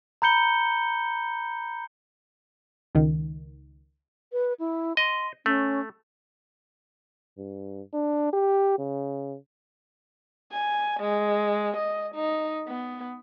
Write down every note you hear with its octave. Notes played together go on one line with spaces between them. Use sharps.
A#5 B5 G6 C#7 G7
C#2 D#3
B4
E4
D#5 C6
A3 C#4
G2
D4
G4
C#3
G#5
G#3
D#5
D#4
B3